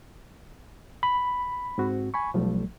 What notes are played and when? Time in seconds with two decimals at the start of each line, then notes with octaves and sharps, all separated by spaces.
1.03 B5
1.78 G#2 C4 F#4
2.14 G#5 B5 C#6
2.34 B1 F3 G3 A3